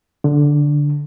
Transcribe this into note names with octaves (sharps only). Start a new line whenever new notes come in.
D3